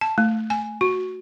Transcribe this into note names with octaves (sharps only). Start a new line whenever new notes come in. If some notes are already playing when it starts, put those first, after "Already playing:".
A5
A3
G#5
F#4